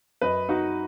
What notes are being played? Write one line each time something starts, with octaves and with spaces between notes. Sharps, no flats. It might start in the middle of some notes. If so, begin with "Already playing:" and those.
F#2 B4 D#5
D#4 F#4